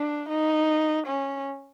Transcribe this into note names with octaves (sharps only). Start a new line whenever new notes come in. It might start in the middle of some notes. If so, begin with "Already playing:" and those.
Already playing: D4
D#4
C#4